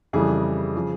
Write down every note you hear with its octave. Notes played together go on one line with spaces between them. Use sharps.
F2 C#3 E3 G3 G#4
C#3 F3